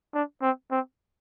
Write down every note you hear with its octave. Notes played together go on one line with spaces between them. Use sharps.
D4
C4
C4